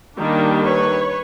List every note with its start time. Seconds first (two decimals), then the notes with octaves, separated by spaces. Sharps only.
0.18 D#3 G3 A#3 D4
0.63 B4 C#5